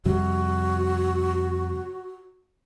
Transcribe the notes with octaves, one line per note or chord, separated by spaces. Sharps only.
F2 C3 G3 F#4